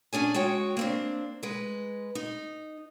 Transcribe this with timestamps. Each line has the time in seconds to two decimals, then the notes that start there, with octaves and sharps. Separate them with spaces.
0.13 C#4 D4 G#4 G#5
0.34 G#3 F#4 C#5 G5
0.77 A#3 C4 D4
1.43 G#3 B4
2.15 D#4